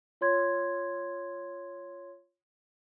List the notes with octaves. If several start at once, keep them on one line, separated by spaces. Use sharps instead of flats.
F4 C#5 C6 G#6